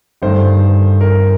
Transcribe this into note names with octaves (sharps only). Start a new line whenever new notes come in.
G1 G2 D#3 A3 C5
A#4